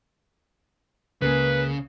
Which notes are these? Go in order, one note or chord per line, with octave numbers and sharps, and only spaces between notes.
C#2 C#3 A#3 B4 G#5